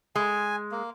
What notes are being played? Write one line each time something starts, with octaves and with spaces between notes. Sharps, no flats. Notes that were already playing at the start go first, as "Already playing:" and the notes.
G#3 G#5
A#3